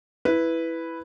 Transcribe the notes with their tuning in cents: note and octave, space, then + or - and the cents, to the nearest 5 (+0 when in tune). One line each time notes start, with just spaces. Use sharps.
E4 +0 B4 +0